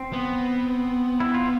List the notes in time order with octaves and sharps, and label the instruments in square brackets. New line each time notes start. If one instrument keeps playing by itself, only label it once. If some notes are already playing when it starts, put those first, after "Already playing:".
Already playing: [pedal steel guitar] C4
[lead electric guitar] B3
[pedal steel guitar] E4
F4